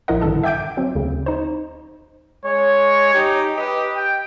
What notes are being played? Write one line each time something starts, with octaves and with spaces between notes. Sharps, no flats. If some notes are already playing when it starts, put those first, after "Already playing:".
A#1 F3 E4 A#4 D#5 F#5
A#1 G2 D3 D#3 A4 A5
E5 F#5 G5 D6 G6 D7
F#3 C4
D2 C#3
D#4 C5
G#3 C#5
D#4 G4
G4 B4 D#5
G5